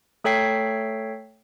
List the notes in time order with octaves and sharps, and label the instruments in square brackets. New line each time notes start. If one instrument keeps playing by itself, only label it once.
[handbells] A3 A4 C#5 G5 B6 C7